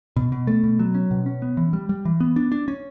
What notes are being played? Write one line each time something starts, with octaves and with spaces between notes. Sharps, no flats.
B2
B2
A3
B2
F#3
C#4
B2
C#4
B3
E3
G3
G3
E3
B3
D4
D4
C#4